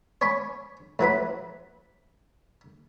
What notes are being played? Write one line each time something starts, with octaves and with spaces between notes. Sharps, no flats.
C#5 G#5 B5 C#6
A2 F#3 B4 B5